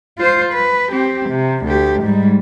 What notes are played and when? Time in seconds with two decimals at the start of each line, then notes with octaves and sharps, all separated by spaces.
0.18 F4 C5
0.53 B4
0.92 C4 G4
1.30 C3
1.65 D2 G4
2.03 G#2 G3